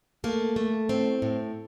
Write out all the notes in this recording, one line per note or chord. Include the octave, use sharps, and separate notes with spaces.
A3 A#3
A3
A2 C4
A2